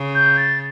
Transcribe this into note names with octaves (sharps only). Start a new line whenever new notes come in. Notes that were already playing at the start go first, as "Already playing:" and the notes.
Already playing: C#3
G6
A6